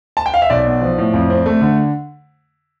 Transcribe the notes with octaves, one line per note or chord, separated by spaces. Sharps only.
A5
G5
F5
E5
B1 D5
B3
F3
A2
F2
C4
A3
D3